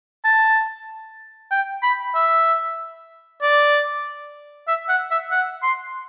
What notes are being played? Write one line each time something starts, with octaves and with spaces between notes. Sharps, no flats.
A5
G5
B5
E5
D5
E5
F#5
E5
F#5
C6